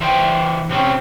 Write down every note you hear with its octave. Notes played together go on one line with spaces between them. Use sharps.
E3 C5 F5 G5
C3 C4 C#4